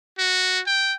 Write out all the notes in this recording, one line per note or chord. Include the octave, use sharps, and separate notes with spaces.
F#4
G5